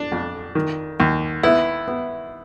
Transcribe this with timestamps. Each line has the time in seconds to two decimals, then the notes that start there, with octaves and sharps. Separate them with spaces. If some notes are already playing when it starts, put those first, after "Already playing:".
Already playing: D4
0.12 F2
0.55 D#3
1.00 D#2
1.43 B3 E4
1.88 B3